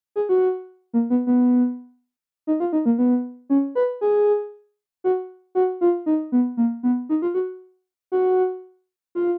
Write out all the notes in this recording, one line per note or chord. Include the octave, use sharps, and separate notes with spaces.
G#4
F#4
A#3
B3
B3
D#4
F4
D#4
A#3
B3
C#4
B4
G#4
F#4
F#4
F4
D#4
B3
A#3
B3
D#4
F4
F#4
F#4
F4